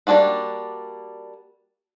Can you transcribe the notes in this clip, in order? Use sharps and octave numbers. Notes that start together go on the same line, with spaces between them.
G3 A#3 D4 F4 F#4